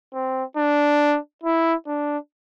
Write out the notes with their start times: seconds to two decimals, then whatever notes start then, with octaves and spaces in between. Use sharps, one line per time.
0.13 C4
0.57 D4
1.43 E4
1.87 D4